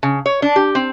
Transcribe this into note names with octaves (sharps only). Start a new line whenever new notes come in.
C#3
C#5
D4
G4
C4